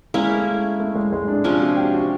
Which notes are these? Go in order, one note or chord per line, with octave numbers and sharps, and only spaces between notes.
G#3 A#3 C#4 E4
A3
A3
G#3
G#3
D4
C3 F3 A#3 C#4 D4
F#4
G4
F#4